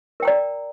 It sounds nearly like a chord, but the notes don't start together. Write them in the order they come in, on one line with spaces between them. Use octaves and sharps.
A#4 G5 A#5 D5